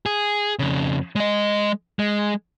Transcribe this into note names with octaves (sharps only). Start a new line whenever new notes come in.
G#4
F2 C#3
G#3 D#5
G#3